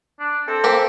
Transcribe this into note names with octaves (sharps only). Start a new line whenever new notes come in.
D4
C4 A4
A#3 G4 C5